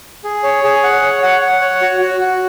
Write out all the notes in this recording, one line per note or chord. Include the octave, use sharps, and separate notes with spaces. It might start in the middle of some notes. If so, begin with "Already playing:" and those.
G#4
C#5
G#4
F#5
C#5
F#5
F#5
C#5
F#4
F#4
F#4